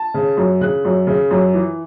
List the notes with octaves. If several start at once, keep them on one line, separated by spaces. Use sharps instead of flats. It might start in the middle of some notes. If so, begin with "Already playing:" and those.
Already playing: A5
C#3
F#2
C#3 F#6
F#2
C#3
F#2
E3